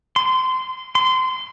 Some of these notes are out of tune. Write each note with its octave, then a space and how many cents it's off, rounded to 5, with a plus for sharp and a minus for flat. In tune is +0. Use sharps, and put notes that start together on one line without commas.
C6 -20
C6 -20